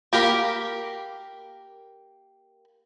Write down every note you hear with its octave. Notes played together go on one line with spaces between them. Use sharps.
A#3 G4 A#4 B5